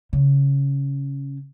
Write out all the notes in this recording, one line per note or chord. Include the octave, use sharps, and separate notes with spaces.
C#3